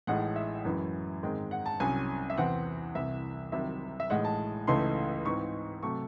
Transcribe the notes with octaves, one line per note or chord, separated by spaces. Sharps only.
A1 A2 G#3 D#4 F#5
E5
F#2 E3 G#3 C#4 E4
G#2 D#3 G#3 C4
F#5
A5
C2 C3 F#3 C#4 G#5
E5
E2 C3 E3 C4 F#5
C2 C3 E3 E5
C2 C3 D#3 F#3 E5
E5
A1 A2 G#3 D#4 F#5
A5
C#2 C#3 E3 A3 D#4 C6
G#2 E3 C4 D#4 C#6
C3 F#3 A3 C#6